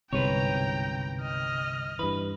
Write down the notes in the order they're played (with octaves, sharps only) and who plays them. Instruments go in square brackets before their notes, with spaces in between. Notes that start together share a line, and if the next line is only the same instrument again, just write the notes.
[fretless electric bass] G1 C2 G#2 [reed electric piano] C3 [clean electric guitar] B4 C#5 [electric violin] G5 A#5
[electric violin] D#5 F6
[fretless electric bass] G2 E3 [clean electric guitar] B4